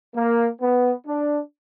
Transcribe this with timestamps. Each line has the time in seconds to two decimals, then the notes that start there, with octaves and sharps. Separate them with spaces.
0.15 A#3
0.61 B3
1.07 D4